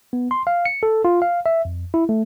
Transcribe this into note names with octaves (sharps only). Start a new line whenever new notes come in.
B3
C6
F5
C#7
A4
F4
F5
E5
F2
E4
A3